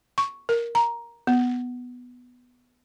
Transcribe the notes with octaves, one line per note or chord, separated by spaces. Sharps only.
C#6
A#4
A#5
B3